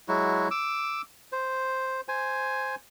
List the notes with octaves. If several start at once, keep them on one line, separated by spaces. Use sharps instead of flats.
F#3 G#3 E4 F#4
D6 E6
C5
C5 G#5